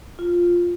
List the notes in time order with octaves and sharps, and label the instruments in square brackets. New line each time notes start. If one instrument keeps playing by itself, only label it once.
[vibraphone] F4